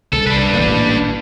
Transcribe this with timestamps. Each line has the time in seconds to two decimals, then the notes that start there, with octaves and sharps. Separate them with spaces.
0.13 C2 A4
0.27 D4 B4
0.53 D#1 A1 A#3